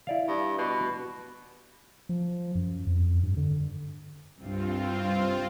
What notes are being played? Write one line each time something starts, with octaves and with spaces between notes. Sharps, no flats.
E4 D5 F5
G2
B2
F3
F#2
F2
G2
D3
C2 G2 C4 F4